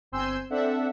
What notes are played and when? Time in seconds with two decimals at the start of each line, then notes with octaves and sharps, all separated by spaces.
0.12 G1 C4 G#5 C6 E6 G6
0.50 C4 D4 A4 E5 F#5